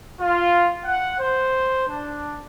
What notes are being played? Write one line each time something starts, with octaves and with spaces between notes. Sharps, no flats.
F4
F#5
C5
D4